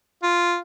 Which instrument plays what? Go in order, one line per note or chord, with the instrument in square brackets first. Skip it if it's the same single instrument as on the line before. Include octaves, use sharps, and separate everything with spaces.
[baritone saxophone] F4